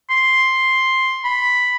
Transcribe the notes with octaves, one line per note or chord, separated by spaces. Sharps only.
C6
B5